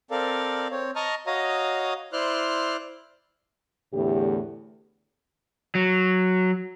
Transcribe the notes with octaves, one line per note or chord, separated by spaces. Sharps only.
C4 A4 A#4 D5 F5
C4 C#5
D#5 A5 A#5 C#6 D#6 F6
F#4 C#5 D#5 F5 A#5 D#6
E4 C5 D5 C6 F6 F#6
E2 A2 D3 A3 E4 G4
F#3